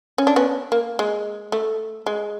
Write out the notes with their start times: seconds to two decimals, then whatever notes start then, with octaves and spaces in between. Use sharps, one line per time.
0.18 C#4
0.27 D4
0.36 B3 C#4
0.72 A#3
0.99 G#3
1.52 A3
2.06 G#3